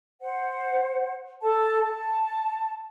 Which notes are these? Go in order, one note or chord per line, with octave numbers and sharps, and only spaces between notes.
C5 F#5
A4 A5
A5